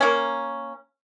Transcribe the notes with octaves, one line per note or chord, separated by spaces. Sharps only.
A#3 C#4